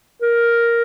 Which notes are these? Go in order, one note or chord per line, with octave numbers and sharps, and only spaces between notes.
A#4